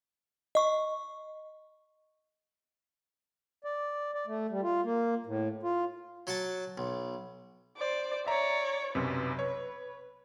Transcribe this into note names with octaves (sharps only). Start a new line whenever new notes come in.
D#5 C#6
D5
D5
A3
G3
F4
A#3
A2
F4
F#3 F#4 F#5 A5
B1
C5 D5
C#5 D5 E5 A#5
B1 F#2 C3 B4
C#5